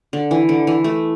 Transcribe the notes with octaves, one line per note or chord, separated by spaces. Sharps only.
D3
E3
D3
E3
A3